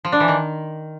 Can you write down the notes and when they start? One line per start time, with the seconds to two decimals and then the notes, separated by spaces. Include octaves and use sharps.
0.05 F3
0.12 D4
0.20 E3
0.28 D#3